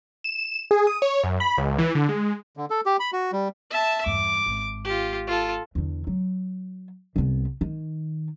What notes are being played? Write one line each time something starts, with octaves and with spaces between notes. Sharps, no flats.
E7
G#4
D#6
C#5
F#2
B5
C#2
E3
D3
G#3
D3
A4
G4
B5
F#4
G3
E5 A5
E2 G2 D6
G#1
F4 G4
F4 A4
E2 D3
F#3
C2 B3
D#3